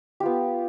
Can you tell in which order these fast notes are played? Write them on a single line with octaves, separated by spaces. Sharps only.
G4 F4 B3